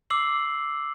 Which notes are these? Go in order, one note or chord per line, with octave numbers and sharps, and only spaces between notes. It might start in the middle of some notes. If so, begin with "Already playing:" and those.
D6 E6 C7 F#7